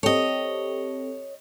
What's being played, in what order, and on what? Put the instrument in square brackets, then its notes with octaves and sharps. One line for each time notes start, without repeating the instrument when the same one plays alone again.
[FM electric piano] C4 G4 A4 [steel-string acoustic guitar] C#5 D#5